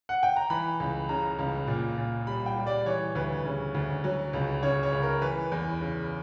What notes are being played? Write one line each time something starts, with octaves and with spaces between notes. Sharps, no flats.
F#5
G5
A#5
E3 B5
C#2
C#3 A#5
C#2
A#2
A#2
G3 B5
G5
G3
D5
E3 C#5
D2 B4
C#3
D2
F#3
C#2
C#3 C#5
C#5
C#2
A#4
E3 B4
E2
C#3